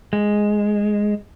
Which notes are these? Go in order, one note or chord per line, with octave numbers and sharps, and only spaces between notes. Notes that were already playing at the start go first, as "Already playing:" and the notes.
G#3